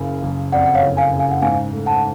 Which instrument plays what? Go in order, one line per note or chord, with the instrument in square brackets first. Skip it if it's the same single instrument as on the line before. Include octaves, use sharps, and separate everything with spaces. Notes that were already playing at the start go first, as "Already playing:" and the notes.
Already playing: [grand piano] F#1 C#3
F#1
[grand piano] F2 [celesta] D5 F#5
[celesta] F#5
C#5 F5
[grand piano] F#1
[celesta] F5 G#5
[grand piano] C#3
[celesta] F5 G#5
F#5
[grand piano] G#2 [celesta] F5 G#5
[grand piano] A3
[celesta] F#5 A5